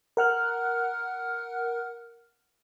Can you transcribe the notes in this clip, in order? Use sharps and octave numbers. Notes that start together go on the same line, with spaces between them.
A#4 F#5 F6 F#6